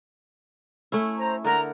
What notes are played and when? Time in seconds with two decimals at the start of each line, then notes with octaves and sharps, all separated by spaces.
0.92 A3 C#4 E4
1.17 C5 A#5
1.44 D3 A#4 F#5 A#5